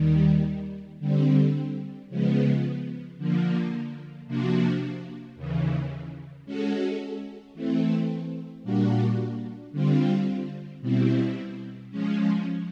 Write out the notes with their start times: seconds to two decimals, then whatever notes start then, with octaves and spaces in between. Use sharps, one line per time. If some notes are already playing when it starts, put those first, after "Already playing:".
Already playing: D#2 D#3 G3
0.99 D3 G3 C4
2.09 C#3 F3 G#3 B3
3.18 D3 F3 A#3
4.27 C3 F3 A#3 D4 F#4
5.36 D#2 C#3 E3
6.46 G#3 C#4 F#4 A4
7.54 E3 A3 C4
8.63 A#2 G3 A#3 D4 F#4
9.72 D3 G3 C4 F4
10.81 B2 G3 C4 E4
11.90 F3 G#3 C#4